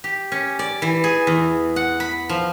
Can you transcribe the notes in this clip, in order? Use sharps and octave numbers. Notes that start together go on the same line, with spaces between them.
G4
C#4
D5
E3
G#4
E2
F#5
B5
F3